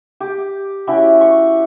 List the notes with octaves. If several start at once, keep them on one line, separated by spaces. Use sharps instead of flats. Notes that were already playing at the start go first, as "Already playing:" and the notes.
G4
C#4 E4 F#4 G4
C#6